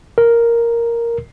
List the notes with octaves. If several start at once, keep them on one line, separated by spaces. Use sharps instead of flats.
A#4